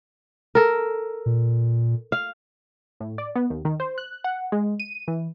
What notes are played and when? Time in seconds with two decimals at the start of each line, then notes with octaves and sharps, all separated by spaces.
0.55 A4 A#4
1.26 A#2
2.12 F5
3.00 A2
3.18 D5
3.35 B3
3.50 D#2
3.65 D#3
3.80 C5
3.98 F#6
4.24 F#5
4.52 G#3
4.80 D#7
5.08 E3